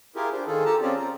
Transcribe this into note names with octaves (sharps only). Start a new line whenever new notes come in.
E4 F4 G4 G#4 A#4
D4 C5
D#3 F4 G#4 A4
G4 A4 A5 A#5
C4 C#4 F4 G#4 D5
C5 A#5